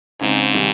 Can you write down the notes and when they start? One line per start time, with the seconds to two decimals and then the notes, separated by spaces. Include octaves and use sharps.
0.21 G#2 C#3 G#3 C4 D#4
0.53 C3 D#3 G3